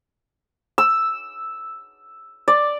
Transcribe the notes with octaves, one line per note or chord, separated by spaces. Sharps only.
E6
D5